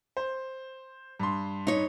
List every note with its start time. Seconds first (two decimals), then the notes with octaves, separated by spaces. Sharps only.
0.17 C5
1.20 G2 C6
1.67 D#4 C#5